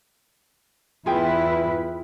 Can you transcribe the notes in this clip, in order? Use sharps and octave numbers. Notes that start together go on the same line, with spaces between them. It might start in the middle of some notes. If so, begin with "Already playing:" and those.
E2 E4 F4 G#4 B4 G5